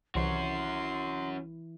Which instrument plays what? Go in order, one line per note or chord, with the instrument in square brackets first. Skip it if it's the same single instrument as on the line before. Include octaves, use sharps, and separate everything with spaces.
[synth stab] C2 [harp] E3 [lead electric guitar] C#4 F#4 [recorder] C6